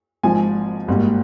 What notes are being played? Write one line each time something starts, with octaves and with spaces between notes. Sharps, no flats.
G#1 G#2 F3 G#5
G#1 G#2 G3 A#3